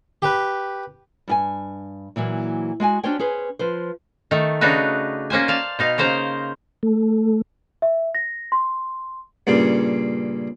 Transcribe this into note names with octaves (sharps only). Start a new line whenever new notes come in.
G4 B4
G2 G4 G#5
A#2 E3 F#3 A#3
G#3 F#4 G5 G#5
C#4 D4 F#4 C5 C#5 G5
C#4 G#4 B4 C5
F3 B4 C5
D#3 A3
C#3 D4 D#4 F#4 B4
A#3 C#4 C5 G#5
D5 F5 A5
B2 D#4 F5
C#3 A#3 C5 F5 A#5
A3
E5
A#6
C6
G2 A#2 C#3